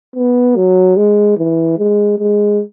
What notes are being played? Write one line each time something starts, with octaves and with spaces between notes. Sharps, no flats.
B3
F#3
G#3
E3
G#3
G#3